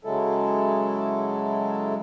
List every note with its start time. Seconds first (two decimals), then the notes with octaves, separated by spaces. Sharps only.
0.05 C#3 F#3 G#3 E4 A4